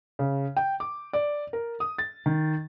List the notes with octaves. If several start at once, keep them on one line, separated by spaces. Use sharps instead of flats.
C#3
G5
D6
D5
A#4
D#6
A6
D#3